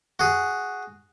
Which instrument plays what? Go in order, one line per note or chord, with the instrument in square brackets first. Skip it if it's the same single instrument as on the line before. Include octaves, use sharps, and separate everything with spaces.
[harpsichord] F#4 G#4